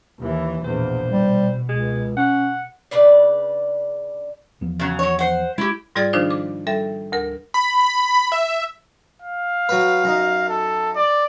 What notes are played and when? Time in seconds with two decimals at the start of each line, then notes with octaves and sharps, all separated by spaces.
0.18 D#2 E3
0.64 A#1 E2 B2 C5
1.11 B2 G3
1.69 C#2 G#3
2.17 C#4 F#5
2.91 C#3 D4 B4 D5
4.61 E2 F3 B3
4.80 C#3 F#3
4.99 F#3 C#5
5.19 C5 F#5
5.58 G#3 E4 G4
5.95 G#2 G3 F4 G#4 D5 A6
6.13 D#3 F3 D4 D#4 F4 C5
6.30 D6
6.67 G3 A4 E5
7.12 D2 A#4
7.54 B5
8.32 E5
9.22 F5
9.69 F#3 B4
10.04 F#2 D#4
10.49 A4
10.96 D5